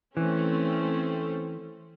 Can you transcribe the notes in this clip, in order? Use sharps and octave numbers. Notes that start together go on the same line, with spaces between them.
E3 A3 C4 C#4